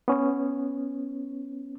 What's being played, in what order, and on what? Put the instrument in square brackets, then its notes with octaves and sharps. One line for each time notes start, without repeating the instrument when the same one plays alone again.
[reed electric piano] B3 C#4